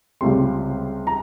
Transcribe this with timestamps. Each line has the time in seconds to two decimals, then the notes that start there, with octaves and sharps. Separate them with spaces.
0.21 C#2 C3 G3 C4 C6
1.07 A#5